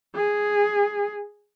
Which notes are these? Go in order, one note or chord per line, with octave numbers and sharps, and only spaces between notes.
G#4